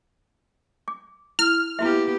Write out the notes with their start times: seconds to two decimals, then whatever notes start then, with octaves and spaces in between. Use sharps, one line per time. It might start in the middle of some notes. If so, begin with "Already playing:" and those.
0.88 D6
1.39 E4 F6
1.79 A#3 B3 E4 F#4 G4 E5